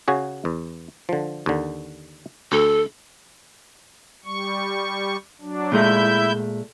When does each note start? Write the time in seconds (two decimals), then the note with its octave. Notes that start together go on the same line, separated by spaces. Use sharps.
0.08 C#3 F#4 G#4
0.45 E2
1.09 D3 F3
1.46 D#2 D3
2.52 D2 A4
4.25 G3 C#6
5.41 F#3 D4
5.72 A#2 G#3 A3 E4 E5 G6